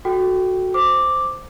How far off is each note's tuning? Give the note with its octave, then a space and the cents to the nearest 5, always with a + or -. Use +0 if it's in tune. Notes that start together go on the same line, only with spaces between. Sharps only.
F#4 +0 A4 -15 G5 -10
C5 -5 D6 +0